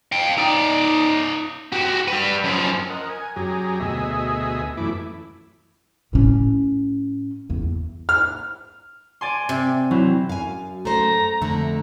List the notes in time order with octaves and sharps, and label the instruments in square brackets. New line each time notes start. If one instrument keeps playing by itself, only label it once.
[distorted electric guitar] F5 G5
D#4 D5
F#4 G4
G3 B4
F#2 F3
[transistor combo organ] A#4 D#5 F#5
G#5
F#2 F#3 G4 G#4 A#5
D2 B2 G#4 D#5 E5
F#2 E3 A3 E4 D6
[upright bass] A2 C#4
E2
[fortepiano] F6
[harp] D5 G#5 C6
[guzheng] C3
[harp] F#3 C4 E4
[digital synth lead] F#2 [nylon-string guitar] F5 G#5
[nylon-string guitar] A3 C5 [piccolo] A#5
[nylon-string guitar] F2 D3 [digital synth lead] A3